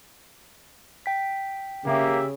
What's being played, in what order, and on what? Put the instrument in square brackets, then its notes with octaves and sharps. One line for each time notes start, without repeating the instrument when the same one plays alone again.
[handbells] G5 B6
[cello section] C#3 [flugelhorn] A#3 [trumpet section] G4 E5